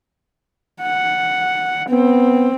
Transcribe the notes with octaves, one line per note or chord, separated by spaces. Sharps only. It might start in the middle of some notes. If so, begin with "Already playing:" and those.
F#5
B3 C4